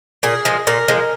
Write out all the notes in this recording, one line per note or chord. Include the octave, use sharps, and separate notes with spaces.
A#2 G#4
F3 G#3
A#2 A#4
F3 G#3